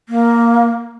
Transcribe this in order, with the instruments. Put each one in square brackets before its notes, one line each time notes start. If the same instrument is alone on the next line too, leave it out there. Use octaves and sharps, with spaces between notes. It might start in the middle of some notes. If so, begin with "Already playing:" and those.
[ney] A#3